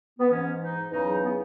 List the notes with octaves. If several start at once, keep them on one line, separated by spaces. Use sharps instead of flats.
B3
G#2 E3 C#4
D#4
E2 C#3 F#3 D#4
B3